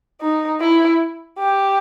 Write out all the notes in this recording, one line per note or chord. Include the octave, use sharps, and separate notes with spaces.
D#4
E4
G4